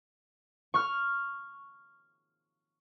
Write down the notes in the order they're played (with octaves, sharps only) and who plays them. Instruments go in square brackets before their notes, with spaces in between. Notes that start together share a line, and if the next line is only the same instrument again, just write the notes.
[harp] C#6 F6